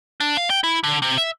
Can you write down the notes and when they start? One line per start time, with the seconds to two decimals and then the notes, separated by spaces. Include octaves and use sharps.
0.20 D4
0.37 F5
0.50 G5
0.64 E4
0.84 D3
1.02 C3
1.17 E5